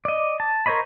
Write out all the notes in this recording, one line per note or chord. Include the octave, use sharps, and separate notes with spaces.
D5 D#5
A5
A#4 C5 C#5 D#5 B5